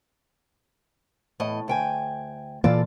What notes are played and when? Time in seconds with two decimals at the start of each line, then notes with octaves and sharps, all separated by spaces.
1.40 E2 A2 D#5
1.68 D2 G5 G#5
2.64 A#2 E3 A#3 F4 A4 D5